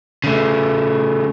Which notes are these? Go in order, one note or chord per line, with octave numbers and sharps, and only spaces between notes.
C#3 A3